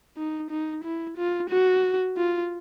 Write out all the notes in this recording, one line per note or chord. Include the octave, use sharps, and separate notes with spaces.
D#4
D#4
E4
F4
F#4
F4